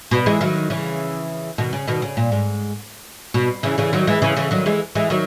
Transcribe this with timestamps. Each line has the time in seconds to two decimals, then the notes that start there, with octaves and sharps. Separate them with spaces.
0.11 B2
0.26 E3 G#3
0.41 D#3 F#3
0.70 C#3 E3
1.58 B2 D#3
1.73 C#3
1.87 B2 D#3
2.02 C#3
2.17 A#2
2.32 G#2
3.34 B2
3.63 C#3 E3
3.78 C#3 E3
3.93 D#3 F#3
4.07 E3 G#3
4.22 C#3 E3
4.37 C#3 E3
4.51 D#3 F#3
4.66 E3 G#3
4.95 E3 G#3
5.10 D#3 F#3